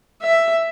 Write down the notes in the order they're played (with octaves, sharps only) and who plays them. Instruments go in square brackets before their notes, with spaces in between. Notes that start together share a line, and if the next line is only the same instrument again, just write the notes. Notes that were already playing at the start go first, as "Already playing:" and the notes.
[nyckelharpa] E5